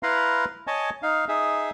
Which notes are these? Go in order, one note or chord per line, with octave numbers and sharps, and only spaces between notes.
E4 B4 F5 A#5 C6
C#5 D#5 G#5 A5
D#4 F5
D#4 G#4 E5